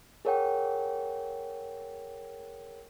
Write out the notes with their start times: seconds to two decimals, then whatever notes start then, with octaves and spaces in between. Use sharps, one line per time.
0.25 G#4 A#4 C#5 F#5 G5